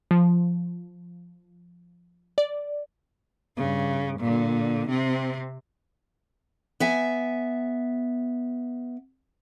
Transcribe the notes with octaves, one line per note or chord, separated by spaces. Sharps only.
F3
D5
G2 C#3
A#2 D3
C3 C4
B3 E5 G#5